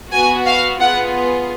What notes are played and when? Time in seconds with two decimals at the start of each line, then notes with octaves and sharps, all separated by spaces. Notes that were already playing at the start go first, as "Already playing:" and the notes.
0.11 B3 F#4 G#5
0.46 F5
0.80 B3 F4 G#4 F#5